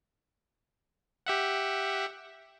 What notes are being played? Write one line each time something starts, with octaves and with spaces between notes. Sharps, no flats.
G4 E5 F#5